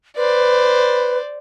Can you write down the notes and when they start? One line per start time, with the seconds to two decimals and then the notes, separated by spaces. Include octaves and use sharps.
0.17 B4 C5 D5